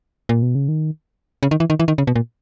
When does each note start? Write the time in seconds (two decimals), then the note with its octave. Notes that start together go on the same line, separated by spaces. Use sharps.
0.29 A#2
0.42 B2
0.55 C#3
0.68 D#3
1.43 C#3
1.51 D#3
1.60 E3
1.70 D#3
1.80 E3
1.88 D#3
1.98 C#3
2.07 B2
2.16 A#2